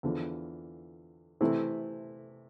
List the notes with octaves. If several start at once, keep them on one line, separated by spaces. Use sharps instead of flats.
E2 D3 F3
C3 E3 A3 C4 E4